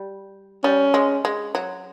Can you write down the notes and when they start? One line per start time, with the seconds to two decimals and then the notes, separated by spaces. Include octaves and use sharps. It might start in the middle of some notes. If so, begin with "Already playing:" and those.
Already playing: G3
0.64 G3 C#4
0.94 G#3
1.25 G#3
1.55 F#3